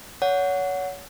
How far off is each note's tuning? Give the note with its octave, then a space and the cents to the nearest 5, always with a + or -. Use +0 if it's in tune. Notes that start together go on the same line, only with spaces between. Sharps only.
C#5 +30 F#5 -5